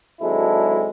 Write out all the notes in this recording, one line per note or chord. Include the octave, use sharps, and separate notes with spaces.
G#1 F#3 G#3 D4 E4 A4